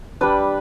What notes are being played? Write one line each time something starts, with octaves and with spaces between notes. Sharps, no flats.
G3 D4 B4